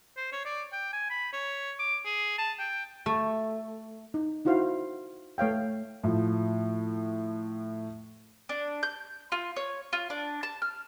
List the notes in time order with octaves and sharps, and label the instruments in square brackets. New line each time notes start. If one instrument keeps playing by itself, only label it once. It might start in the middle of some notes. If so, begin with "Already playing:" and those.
[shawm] C5
C#5
D5
G5
G#5
B5
C#5
D6
G#4
A5
G5
[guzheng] A3
[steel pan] D#4
D#4 E4 F#4 C5 F5 F#5
A3 C#5 F5 G5
[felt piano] A2 F3
[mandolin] D4
G6
F4
C#5
F4
D4
A5
F6